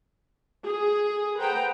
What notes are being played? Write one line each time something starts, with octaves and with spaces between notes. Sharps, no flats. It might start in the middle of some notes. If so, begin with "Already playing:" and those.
G#4
B4 C5 F#5 G5 A#5